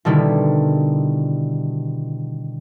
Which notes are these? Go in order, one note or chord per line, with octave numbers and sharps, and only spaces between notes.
B2 D3 D#3 G3 E4